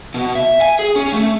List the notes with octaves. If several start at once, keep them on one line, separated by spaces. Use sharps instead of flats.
B2
E5
G#5
G#4
C#4
A3